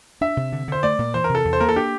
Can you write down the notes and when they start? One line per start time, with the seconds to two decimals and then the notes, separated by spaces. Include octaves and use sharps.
0.21 D4 E5
0.37 C3
0.52 D3
0.68 D3 C5
0.83 A3 D5
0.99 A#2
1.14 E3 C5
1.24 A#4
1.29 C3
1.35 A4
1.45 E2
1.53 C5
1.60 A#3 A#4
1.69 A4
1.76 D4 G4